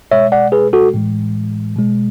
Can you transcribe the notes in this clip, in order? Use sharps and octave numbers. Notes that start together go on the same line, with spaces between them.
B2 G#3 C#5 E5
D5 F#5
G#4 B4
F#4 A4
A2 E3 G#3
B2 G#3